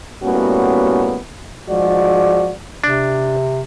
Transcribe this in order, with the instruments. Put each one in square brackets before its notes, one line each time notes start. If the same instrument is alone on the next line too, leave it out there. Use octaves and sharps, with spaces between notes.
[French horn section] A2 G3 A#3 B3 C#4 F#4
G#2 F3 G#3 F#4 D5
[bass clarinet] C3 [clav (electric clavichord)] D4